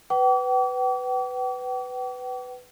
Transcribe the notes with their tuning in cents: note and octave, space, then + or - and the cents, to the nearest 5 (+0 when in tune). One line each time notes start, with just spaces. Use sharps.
B4 +15 G5 -45 D6 -40